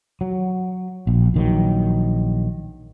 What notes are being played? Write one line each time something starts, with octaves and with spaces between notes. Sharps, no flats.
F#3
A#1
A#1 D#3 F#3